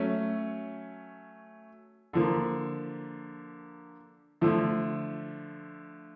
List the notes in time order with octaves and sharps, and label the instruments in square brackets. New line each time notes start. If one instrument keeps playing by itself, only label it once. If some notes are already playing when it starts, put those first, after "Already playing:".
Already playing: [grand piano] F#3 A3 C#4
D3 F3 A#3
D3 F3 A3